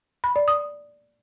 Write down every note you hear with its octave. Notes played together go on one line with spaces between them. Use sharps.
B5
D5
D#6